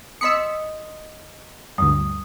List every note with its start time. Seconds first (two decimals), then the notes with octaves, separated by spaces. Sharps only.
0.21 D#5 C6 D#6 E6 B6 C#7
1.78 D2 G2 D#6